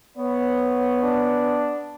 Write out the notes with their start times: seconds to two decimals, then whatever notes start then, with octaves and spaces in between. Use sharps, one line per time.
0.17 B3 C#5
1.03 D4